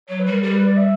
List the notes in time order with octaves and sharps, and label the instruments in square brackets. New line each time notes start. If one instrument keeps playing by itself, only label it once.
[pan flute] F#3 [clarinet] C#5
[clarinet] B4
[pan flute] G3
[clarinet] A#4
[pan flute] G3 [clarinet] G4
[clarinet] B4
D5
E5